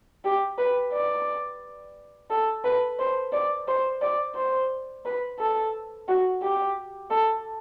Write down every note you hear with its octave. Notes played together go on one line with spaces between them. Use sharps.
G4
B4
D5
A4
B4
C5
D5
C5
D5
C5
B4
A4
F#4
G4
A4